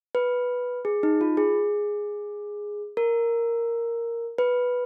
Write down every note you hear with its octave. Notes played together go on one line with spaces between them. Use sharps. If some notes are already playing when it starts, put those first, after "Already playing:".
B4
G#4
D#4
F4
G#4
A#4
B4